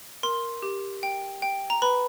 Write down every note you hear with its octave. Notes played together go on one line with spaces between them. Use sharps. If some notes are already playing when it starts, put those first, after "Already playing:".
A#4 C6
G4
G5
G5
A#5
B4 B5